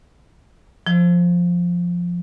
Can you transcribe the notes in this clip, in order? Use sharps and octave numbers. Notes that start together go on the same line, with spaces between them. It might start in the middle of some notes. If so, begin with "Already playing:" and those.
F3